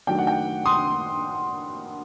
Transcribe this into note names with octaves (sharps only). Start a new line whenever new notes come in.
D#3 F#3 A3 D4 G5
F#5
G5
C6 D#6